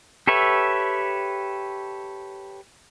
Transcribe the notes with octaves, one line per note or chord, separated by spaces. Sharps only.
G4 A4 B4 C#5 E5